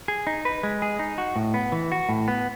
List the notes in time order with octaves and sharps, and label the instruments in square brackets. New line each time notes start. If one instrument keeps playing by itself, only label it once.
[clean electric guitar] G#4
D#4
B4
G#3
G#4
D#4
F#4
A2
B3
E3
F#4
A2
B3